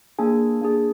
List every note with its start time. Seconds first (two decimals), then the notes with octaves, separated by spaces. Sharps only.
0.19 A#3 D4 G#4 G#5
0.61 A#3 D4 G#4